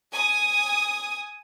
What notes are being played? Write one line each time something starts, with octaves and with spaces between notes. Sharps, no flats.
G#5 D#6